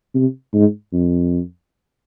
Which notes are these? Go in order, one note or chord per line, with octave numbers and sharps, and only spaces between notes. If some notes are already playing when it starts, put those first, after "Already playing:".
C3
G#2
F2